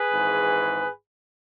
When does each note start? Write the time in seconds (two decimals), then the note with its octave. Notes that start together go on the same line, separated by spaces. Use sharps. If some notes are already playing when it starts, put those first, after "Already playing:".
Already playing: G#4 B4
0.12 G#1 G#2 E3